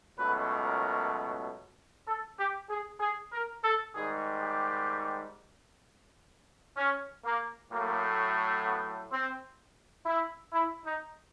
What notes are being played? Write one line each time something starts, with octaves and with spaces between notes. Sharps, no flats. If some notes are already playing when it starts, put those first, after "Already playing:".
C#2 B2 F#3 A3 B4
A#4
A4
G4
G#4
G#4
A#4
A4
G#2 D#3 G3 G#4
G4
C#4
A#3
A2 F#3 A3 A#3
B3
C4
E4
E4
D#4